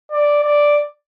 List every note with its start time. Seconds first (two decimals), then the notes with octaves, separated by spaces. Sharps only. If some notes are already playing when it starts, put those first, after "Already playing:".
0.12 D5
0.44 D5